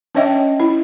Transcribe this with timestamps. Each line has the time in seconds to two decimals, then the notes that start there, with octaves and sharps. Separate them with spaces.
0.15 C#4 D4 C#5 D#5 E5 G5
0.60 E4